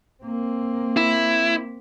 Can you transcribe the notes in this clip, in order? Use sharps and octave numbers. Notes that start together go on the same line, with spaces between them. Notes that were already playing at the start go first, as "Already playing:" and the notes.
A#3 C4
E4